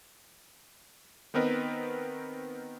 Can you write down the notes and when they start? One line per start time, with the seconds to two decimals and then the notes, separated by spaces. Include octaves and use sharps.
1.34 D#3 B3 C4 A#4 B4 D#5